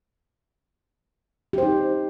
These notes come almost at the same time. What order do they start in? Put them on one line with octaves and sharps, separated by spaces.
G4 C5 D#4